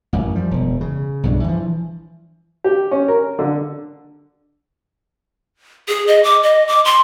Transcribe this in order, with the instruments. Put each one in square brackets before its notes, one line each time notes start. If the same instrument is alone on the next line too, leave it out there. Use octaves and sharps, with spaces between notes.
[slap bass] A1 F#2
F3 G3
E1
C#3
B1 G2 F3 D4
E3 F3
[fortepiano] G4
C#4
A#4
D3
[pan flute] G#4
D#5
D6
D#5
D6
C6